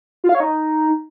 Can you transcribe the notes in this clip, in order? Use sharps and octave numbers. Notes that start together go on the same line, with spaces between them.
F4
F5
C#5
D#4